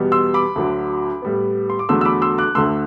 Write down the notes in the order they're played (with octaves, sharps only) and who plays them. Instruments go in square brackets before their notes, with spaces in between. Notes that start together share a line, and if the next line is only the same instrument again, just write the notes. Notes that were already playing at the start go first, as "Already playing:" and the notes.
Already playing: [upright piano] E2 B2 G3 B3
C6 E6
B5 D6
D2 D3 F#3
A2 G3 B3
C6
D6
E2 D3 F#3 A3 C6 E6
E6
B5 D6
C6 E6
D6 F#6
D2 D3 A3 C6 E6